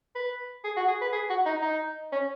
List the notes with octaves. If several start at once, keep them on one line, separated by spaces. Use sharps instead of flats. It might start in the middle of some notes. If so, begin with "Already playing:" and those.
B4
G#4
F#4
G#4
B4
G#4
F#4
D#4
D#4
C#4